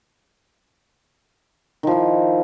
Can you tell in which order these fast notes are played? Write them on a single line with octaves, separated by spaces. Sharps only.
D#3 F3 E4